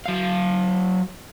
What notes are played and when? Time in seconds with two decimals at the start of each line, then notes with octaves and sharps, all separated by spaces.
0.06 F#3 F5